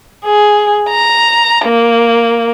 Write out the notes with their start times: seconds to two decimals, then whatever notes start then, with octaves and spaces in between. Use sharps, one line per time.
0.25 G#4
0.89 A#5
1.66 A#3